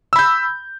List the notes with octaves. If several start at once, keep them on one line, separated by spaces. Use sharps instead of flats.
B5 E6 G6